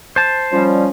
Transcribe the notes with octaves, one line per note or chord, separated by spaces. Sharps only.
C5 A5
F3 G3 C#4